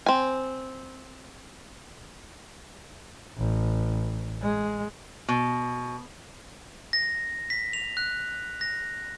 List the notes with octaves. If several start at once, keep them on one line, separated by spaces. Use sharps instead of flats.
C4 G#5
A1
G#3
B2
A#6
B6
F7
F#6
A#6